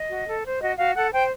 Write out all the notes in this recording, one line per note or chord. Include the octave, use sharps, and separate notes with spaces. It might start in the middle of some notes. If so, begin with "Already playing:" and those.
Already playing: D#5
F#4
A4
C5
F#4 D#5
F#4 F5
A4 F#5
C5 G5